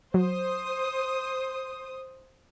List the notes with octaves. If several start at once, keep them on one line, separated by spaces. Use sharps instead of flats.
F#3 C5 D#6